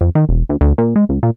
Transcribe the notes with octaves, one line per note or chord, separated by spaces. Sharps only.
F2
D#3
E1
D2
D2
A#2
G#3
C#2
A#2